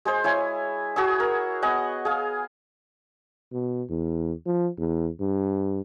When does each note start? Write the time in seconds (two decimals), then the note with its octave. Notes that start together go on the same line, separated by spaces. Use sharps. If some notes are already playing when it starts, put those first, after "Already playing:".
0.05 G#3 G#4 C5
0.24 E4 C#5 G#5
0.96 F#4 G#4 C#6 E6
1.20 A#4
1.62 B3 D#5 F#5 G#5
2.05 G#4 F5
3.52 B2
3.89 E2
4.46 F3
4.78 E2
5.21 G2